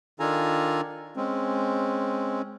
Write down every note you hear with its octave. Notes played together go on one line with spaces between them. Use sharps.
D#3 D4 F4 A4 G#5 A#5
G#3 C4 C#4